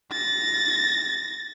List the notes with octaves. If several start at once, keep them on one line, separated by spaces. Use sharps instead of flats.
A6 A#6